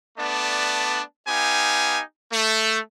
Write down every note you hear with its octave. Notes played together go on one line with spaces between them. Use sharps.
A3 B3 D4 D5 A5
B3 D#4 G4 F5 G#5
A3